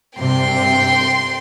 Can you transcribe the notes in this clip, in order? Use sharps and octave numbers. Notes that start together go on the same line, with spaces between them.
G2 C3 G5 C6